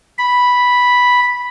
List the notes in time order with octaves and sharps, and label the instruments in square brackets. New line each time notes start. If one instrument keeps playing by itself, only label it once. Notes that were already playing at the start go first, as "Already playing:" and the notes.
[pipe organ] B5